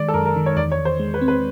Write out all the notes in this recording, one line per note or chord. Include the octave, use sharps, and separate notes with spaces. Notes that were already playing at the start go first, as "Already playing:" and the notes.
Already playing: D#3 G#3 D5
A4
F#2 A#4
A#4
D#3
C#5
E2 D5
C#5
E2
C5
G#3
B4
C4
B4